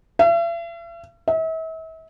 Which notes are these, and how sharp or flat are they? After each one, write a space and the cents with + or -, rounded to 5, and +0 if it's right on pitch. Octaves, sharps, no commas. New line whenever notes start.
E5 +45
E5 -40